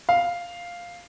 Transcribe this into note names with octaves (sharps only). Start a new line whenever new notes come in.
F5